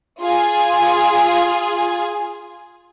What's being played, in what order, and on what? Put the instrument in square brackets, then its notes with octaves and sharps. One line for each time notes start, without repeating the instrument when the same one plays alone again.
[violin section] F4 G#4 G#5